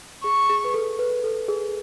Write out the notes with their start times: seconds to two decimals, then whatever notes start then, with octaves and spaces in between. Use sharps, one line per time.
0.24 G#4 C#6
0.49 G#4
0.64 B4
0.74 A4
0.99 B4
1.24 A4
1.48 G#4